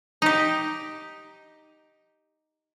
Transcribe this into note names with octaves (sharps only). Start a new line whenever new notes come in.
D#4 G4